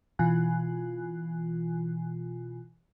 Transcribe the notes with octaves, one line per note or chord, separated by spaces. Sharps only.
B2 E3 F4 G#5 F#6